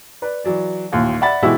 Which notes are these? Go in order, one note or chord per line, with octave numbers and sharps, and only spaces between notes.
B4 D5
E3 F#3 D5
A1 D#2 A#2
D5 E5 F#5 B5 A6
B2 E3 G#3 E4 F#4 G4